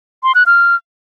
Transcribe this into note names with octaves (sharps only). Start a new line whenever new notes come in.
C6
F#6
F6